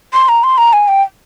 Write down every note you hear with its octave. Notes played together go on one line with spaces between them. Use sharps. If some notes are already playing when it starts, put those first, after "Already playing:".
C6
A#5
C6
A#5
G#5
G5